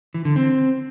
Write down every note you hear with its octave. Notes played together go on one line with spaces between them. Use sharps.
E3
D3
C4